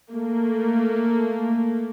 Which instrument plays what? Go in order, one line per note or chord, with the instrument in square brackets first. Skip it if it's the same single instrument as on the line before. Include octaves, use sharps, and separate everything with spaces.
[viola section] A3 A#3